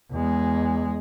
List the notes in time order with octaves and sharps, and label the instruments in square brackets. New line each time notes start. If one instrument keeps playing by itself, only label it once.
[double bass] E2 G#3